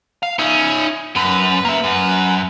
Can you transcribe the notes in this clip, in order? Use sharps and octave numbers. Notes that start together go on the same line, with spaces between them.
F5
C#4 D#4 E5
F#2 B4
A#3 E5
F#2